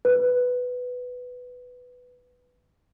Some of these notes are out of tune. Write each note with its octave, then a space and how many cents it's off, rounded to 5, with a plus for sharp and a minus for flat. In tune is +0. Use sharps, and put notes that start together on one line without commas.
B4 +5